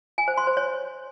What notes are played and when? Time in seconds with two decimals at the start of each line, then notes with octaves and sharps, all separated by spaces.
0.18 G#5
0.28 C5
0.37 C6
0.47 C5
0.57 C#5